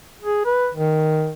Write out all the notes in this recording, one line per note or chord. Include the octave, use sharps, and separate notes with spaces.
G#4
B4
D#3